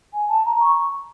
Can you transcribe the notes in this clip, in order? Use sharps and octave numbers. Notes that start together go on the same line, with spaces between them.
G#5
A5
A#5
C#6